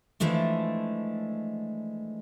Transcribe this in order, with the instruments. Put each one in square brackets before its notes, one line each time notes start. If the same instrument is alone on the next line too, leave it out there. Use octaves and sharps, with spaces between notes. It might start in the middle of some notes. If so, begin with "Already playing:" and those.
[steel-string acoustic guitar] E3 F3 G#3 A3 D4